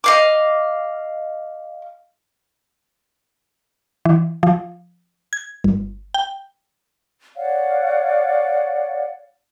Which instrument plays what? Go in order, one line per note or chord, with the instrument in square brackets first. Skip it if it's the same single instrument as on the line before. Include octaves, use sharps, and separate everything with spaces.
[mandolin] D#5 F5 D6
[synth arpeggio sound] E3
F3
G#6
G1
G5
[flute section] C#5 D5 F5 F#5